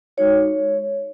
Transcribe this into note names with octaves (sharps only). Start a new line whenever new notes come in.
G#3 D#4 F#4 C#5